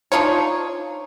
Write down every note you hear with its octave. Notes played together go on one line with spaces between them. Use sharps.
D4 D#4 F4 C#5